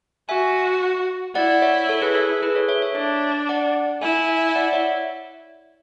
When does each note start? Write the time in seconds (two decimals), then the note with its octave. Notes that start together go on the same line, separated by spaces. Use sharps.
0.29 F#4 E5 G#5
1.35 E4 D5 F#5
1.62 C#5 E5
1.89 A4 C#5
2.02 G#4 B4
2.15 A4
2.29 A4
2.42 G#4 B4
2.55 A4 C#5
2.68 C#5 E5
2.82 C#5 E5
2.95 D4 C#5 E5
3.49 D5 F#5
4.02 E4 E5 G#5
4.28 E5 G#5
4.49 E5
4.55 D5 F#5
4.73 C#5 E5